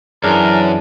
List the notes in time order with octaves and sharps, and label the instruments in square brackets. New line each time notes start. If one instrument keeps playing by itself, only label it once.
[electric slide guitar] F#2 [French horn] E3 [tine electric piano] D4 G#4 [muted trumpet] A#4